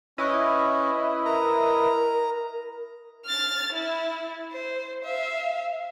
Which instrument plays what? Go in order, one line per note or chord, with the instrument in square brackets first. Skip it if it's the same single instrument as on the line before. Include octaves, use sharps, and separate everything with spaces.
[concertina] C#4 [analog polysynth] E4 B4 D#5
[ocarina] A#4 [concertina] A#5
[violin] F6 A6
E4
C5
E5 F5